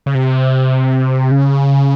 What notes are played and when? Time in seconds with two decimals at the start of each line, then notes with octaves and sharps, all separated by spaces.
0.06 C#3
0.15 C3
1.31 C#3